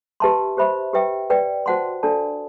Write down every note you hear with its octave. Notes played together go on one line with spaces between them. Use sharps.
G4 B4 E5 A5 C6
G4 C5 E5 B5
G4 B4 E5 G5
B4 D5 G5
F#4 C5 F#5 A5 C6
D4 A4 D5 A5